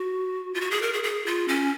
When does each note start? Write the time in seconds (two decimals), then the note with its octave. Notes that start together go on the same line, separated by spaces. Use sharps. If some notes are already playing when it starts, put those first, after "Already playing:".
Already playing: F#4
0.54 F4
0.61 F#4
0.71 G#4
0.82 A#4
0.93 G#4
1.03 G#4
1.26 F4
1.48 C#4